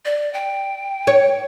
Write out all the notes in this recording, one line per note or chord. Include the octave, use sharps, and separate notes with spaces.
D5
G5
C#5